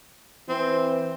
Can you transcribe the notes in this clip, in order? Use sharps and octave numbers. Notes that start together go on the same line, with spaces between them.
E3 C4